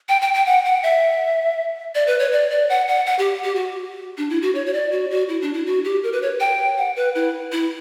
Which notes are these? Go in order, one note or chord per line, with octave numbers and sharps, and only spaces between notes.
G5
G5
G5
F#5
F#5
E5
D5
B4
C#5
D5
D5
F#5
F#5
F#5
G4
G4
F#4
D4
E4
F#4
C#5
C#5
D5
F#4
F#4
E4
D4
E4
F#4
G4
A#4
B4
C#5
G5
F#5
B4
E4
E4